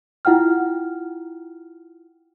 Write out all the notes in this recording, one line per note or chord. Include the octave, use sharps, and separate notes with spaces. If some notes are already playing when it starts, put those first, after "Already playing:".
E4 F4 F#5 G5 F6